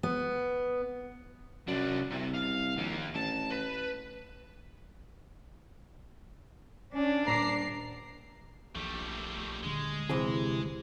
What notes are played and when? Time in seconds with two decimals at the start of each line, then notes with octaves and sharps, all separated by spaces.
0.03 B3
1.68 C2 F#2 D4
2.12 C2 C3
2.35 F5
2.77 A#1 D#2 A#3
3.15 A1 A5
3.50 B4
6.94 C#4 D4
7.27 D#1 A#5 D6 C7
8.75 A#1 E3 G3 A3
9.63 D#1 D3 G#3
10.09 C3 E3 C4 G#4